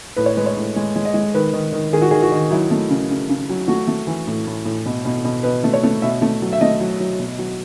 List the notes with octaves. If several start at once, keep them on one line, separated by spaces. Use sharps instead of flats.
A2 B4
C#5
G#3 B4
C#5
A2
G#3
G#3
D#5
G#3
D#3 B4
D#3
D#3
D#3 G#4
F#4
D#3 G#4
F#4
D#3
F#3 E4
A3
C#3
C#3
C#3
F#3
A3 F#4
A3
E3
A2
A2
A2
B2
B2
B2
B2 B4
A3
C#5
A3
B2 E5
A3
F#3
E5
A3 D#5
F#3
F#3
B2
F#3